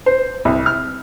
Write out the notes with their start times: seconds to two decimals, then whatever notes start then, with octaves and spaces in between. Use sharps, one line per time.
0.06 C5
0.45 C2
0.66 F6